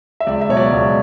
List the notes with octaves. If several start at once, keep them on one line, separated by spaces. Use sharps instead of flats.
E5
C#2 D5
E5
B2 F#3 C#5
D5
C#2 D5